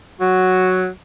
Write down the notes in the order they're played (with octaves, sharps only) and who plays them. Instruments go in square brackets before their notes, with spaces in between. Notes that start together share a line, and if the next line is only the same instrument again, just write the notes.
[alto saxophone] F#3 [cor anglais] F#4